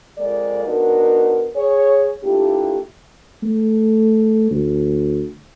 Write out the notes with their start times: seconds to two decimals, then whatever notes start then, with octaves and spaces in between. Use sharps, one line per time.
0.18 F2 G#3 A#3 A#4 D5
0.65 B3 D4 D#4 F#4 A#4
1.56 G#4 C#5
2.24 A3 A#3 D4 E4 F4 G4
3.43 A3
4.51 D2